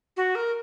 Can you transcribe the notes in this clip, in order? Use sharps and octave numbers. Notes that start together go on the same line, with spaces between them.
F#4
A#4